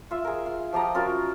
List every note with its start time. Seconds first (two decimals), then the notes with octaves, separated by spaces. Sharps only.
0.11 F4 E5
0.25 G#4 A#4
0.46 F5
0.73 F3 G4 D#5 A#5
0.95 C#4 F4 F#4 A#4